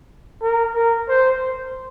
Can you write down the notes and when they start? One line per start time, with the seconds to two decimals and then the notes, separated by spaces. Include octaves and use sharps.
0.42 A#4
0.75 A#4
1.08 C5